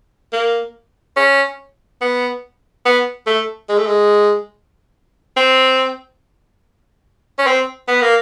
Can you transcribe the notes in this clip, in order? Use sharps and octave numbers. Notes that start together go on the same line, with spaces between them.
A#3
C#4
B3
B3
A3
G#3
A3
G#3
C4
C#4
C4
B3
A#3